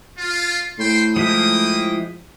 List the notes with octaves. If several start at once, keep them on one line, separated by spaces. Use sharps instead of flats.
F4
A2 C5 G5 C6
F3 G#3 A#3 E4 G5 D#6